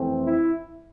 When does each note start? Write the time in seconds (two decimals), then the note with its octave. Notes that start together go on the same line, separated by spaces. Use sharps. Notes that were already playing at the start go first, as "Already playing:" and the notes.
Already playing: F2 E3 A3 C4
0.24 E4